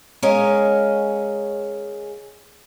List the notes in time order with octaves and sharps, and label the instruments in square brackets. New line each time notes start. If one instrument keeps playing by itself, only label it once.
[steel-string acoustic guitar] G#3 C#4 A#4 C#5 D#5 F5